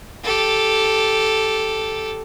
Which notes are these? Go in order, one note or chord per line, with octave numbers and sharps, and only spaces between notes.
G4 A4